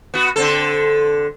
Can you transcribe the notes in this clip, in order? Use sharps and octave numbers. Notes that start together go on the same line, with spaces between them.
B3 F#4
D3 C4 A4